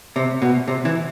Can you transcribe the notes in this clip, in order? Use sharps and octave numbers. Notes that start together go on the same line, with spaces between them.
C3
B2
C3
E3